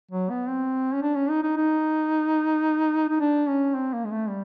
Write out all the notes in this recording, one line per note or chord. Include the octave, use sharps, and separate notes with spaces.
F#3
B3
C4
C#4
D4
C#4
D#4
D#4
D#4
D#4
D4
C#4
C4
A#3
G#3
A3
G3